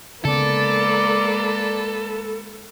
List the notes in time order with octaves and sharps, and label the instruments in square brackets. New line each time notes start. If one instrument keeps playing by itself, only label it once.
[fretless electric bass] C#3 B3 [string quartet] G#3 A#3 B4 [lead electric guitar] A4 [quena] D5